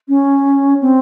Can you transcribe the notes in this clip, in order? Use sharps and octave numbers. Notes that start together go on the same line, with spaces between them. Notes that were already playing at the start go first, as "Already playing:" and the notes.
C#4
C4